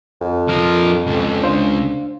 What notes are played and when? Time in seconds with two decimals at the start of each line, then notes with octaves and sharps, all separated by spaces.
0.21 F2
0.49 F3 A#4 F6
1.07 C#2
1.43 D4 C5 F5